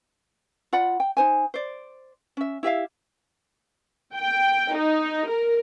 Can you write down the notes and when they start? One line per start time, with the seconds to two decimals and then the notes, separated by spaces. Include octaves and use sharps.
0.73 F4 D5 F#5 B5
1.00 G5
1.17 D#4 C5 G#5
1.54 C5 D5
2.37 C#4 E5
2.63 E4 G4 E5 F5
4.15 G5
4.74 D#4
5.29 A#4